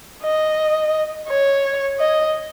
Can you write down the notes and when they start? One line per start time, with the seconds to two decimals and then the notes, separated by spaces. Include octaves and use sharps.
0.23 D#5
1.29 C#5
1.99 D#5